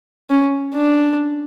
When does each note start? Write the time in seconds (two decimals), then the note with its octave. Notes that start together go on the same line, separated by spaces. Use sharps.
0.30 C#4
0.75 D4